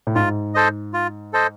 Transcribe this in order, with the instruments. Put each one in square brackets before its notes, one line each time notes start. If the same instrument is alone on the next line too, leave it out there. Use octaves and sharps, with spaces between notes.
[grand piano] A2
[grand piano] G#2 [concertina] F4
[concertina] A4 C5 D#5
F4
A4 C5 D#5